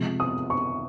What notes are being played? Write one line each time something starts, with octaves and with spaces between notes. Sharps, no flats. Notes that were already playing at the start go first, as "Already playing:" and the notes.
Already playing: C3 F3 G#3
D#6
C#6